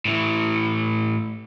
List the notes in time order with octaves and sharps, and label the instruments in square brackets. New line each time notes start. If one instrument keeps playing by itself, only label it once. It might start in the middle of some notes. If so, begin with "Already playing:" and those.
[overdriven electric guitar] A2 E3